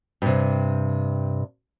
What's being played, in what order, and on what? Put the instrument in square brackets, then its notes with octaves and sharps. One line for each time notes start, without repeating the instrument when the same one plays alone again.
[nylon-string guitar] G2 C3